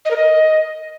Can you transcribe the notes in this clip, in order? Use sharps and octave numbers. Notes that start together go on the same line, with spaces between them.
D#5
A#4
D#5